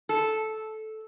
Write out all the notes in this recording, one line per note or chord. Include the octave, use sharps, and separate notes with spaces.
A4